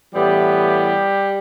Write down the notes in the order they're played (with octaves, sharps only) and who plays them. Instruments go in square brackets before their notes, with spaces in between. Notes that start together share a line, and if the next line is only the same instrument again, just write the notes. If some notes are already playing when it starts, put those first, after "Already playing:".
[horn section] A2 E3 G3 B3 G4